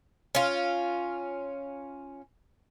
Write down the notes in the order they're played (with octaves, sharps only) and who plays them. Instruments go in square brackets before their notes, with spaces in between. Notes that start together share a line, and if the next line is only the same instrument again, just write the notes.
[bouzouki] C#4 F4